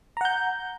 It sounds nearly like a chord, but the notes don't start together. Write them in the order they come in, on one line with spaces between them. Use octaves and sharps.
A#5 F#5 G6